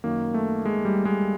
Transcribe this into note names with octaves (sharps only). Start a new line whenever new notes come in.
F#2 D#3 A#3
A3
G#3
G3
G#3